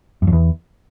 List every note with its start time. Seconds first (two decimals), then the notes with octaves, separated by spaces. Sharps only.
0.22 F#2
0.27 F2
0.32 E2